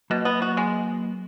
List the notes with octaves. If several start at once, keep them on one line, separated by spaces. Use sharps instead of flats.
B2 F#3 A#3
B3
F#4
G#3